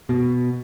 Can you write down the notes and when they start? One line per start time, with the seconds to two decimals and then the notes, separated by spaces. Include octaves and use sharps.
0.09 B2